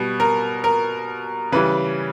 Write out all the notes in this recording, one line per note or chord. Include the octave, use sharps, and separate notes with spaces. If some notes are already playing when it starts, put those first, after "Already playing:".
Already playing: B2 G3
A#4
A#4
C#3 E3 G3 B4